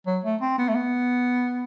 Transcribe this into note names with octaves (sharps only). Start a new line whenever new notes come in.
F#3
A3
C4
B3
A3
B3